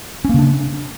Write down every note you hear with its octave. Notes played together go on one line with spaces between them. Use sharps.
C#3 A#3 C#4 D4